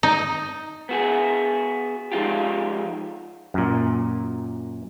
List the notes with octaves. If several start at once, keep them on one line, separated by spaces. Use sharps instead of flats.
D#4
B3 F#4 G#4
F3 G#3 D#4 F4 G4
F#2 A#2